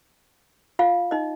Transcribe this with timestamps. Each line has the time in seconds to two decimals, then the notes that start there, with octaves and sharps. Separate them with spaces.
0.79 F4 F5
1.11 D#4 D#5